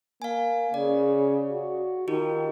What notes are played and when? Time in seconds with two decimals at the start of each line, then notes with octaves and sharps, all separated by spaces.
0.22 A#3 F5 G#5
0.74 C#3 D5
1.50 F#4
2.08 D#3 D#4 F4 G4